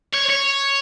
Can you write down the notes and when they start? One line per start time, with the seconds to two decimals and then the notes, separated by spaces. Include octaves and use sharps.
0.14 C#5
0.30 C#5